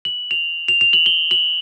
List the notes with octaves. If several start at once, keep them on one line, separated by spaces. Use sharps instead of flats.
F#7
F7
F7
F7
F#7
G7
F#7